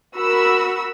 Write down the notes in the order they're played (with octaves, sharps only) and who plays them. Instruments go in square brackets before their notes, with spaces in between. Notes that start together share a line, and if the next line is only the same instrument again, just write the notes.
[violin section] F#4 A#4 B5 E6